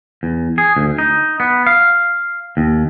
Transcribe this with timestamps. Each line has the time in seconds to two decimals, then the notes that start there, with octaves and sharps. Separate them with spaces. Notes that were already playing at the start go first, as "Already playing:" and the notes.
0.23 E2
0.58 G#4
0.77 D2
0.98 D#4
1.40 B3
1.67 F5
2.57 D#2